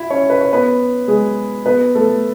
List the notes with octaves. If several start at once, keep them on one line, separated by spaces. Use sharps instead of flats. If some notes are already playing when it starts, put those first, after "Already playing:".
Already playing: E4 F#4 E5
C#4 C#5
B4
C#5
B3 B4
G#3 G#4
B3 B4
A3 A4